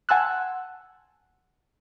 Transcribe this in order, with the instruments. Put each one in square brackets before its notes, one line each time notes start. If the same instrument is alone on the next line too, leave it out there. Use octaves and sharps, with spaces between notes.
[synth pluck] F#5 G#5 A5 C6 E6 F#6